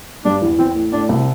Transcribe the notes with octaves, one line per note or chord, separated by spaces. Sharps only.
G2 G3 D4
E2 E3
E2 E3 C4
A2
A2 D4
C2 C3